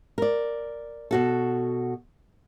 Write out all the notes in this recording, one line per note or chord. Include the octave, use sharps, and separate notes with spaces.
A#4 D5
B2 F#4 A4